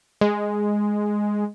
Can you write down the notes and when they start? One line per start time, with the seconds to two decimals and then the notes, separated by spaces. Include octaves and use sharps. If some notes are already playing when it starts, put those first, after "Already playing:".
0.21 G#3